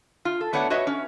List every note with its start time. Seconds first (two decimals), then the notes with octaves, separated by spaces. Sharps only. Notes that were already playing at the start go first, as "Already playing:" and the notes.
0.25 F4
0.41 A4
0.53 A3 B3 D4 C#5 F#5
0.70 F#4 B4 C#5 D#5 E5
0.87 C#4